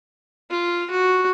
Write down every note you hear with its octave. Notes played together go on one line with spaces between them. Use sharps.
F4
F#4